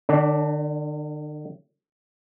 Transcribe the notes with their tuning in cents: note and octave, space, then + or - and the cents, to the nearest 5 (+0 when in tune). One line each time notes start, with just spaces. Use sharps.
D3 +45 D4 +0 C#5 +45